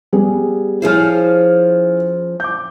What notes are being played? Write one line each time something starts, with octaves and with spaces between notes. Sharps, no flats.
G3 B3 G#4
F3 C#4 E4 G#4 C5 F6
D6 G6